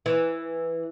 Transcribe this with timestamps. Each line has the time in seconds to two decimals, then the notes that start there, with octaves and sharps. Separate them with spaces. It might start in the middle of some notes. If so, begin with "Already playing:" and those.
0.06 E3